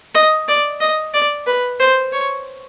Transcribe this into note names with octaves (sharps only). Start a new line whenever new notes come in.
D#5
D5
D#5
D5
B4
C5
C#5